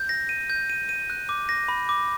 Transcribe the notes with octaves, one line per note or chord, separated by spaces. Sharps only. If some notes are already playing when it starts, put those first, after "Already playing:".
Already playing: G6
A#6
D#7
G6
D#7
D#7
F#6
D6
A#6
B5
D6